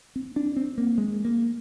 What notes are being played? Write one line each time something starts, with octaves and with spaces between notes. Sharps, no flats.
C4
D4
C4
A#3
G#3
A#3